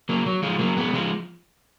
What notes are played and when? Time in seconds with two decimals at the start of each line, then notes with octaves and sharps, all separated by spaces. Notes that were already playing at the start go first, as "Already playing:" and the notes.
0.09 F#3 A#3
0.26 F#3
0.43 F3 G#3
0.59 F#3 A#3
0.77 G#3 B3
0.93 F3 G#3